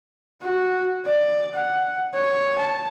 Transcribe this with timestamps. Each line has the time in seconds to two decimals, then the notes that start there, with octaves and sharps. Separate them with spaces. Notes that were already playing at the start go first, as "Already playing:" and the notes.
0.41 F#4
1.05 D5
1.54 F#5
2.14 C#5
2.58 A5